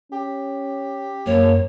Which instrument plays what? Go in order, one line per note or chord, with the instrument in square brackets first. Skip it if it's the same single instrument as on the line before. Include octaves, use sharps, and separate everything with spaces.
[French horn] C#4 [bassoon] G4
[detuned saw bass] F#2 [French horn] A#3 [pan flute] C#5